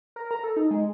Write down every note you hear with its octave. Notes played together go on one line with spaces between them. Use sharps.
A#4
A#5
A4
D#4
G#3